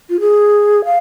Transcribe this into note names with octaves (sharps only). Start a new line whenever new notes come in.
F4
G#4
F5